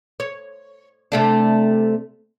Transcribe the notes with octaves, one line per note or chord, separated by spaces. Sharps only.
C#5
C3 A3 D4